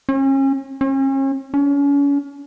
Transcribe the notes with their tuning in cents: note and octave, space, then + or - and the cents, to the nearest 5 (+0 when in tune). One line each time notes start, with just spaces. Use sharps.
C#4 -35
C#4 -40
C#4 +35